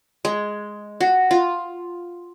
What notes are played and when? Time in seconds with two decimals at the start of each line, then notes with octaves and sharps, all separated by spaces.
0.25 G#3
1.00 F#4
1.31 F4